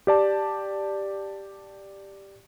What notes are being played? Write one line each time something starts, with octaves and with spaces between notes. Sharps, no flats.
G4 D5 A5